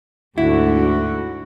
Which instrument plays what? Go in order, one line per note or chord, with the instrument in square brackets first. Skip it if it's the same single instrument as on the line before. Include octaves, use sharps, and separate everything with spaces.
[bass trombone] D2 [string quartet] G#2 D3 [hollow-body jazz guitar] E4 [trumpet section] F#4